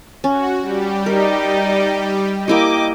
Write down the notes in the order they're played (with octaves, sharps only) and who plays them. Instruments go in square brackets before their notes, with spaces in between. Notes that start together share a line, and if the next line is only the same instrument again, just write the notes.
[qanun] C#4 [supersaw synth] F#4
[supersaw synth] G3 G4
[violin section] D#4 D5 D#5 [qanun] A#4
[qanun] A#3 E4 G4 [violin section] D#5 G5 D6